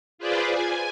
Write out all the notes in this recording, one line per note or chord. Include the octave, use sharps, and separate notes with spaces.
F4 G#4 B4 C5 D5
G#5